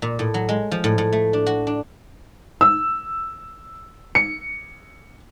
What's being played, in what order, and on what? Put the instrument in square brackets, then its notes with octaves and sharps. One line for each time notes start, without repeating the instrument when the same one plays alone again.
[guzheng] A#2
A2
F#3
G#3
F3
A2
A2
A3
D4
F#4
D4
[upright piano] E6
C#7